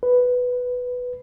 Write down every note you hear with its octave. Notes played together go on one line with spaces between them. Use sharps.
B4